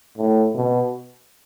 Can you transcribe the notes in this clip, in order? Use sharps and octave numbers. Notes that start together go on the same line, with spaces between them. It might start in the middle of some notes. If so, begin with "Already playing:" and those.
A2
B2